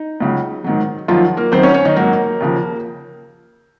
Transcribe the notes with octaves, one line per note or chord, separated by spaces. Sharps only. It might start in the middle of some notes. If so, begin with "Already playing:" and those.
Already playing: D#4
C#2 C#3 F#3
G#2 D#3 F#3
F#2 D#3 F3 F#3 F4
A#3 A#4
F#2 D#3 F#3 C4 C5
C#4 C#5
C#4 C#5
D#3 D#4
G#2 F#3 A#3 A#4
D#2 C#3 F3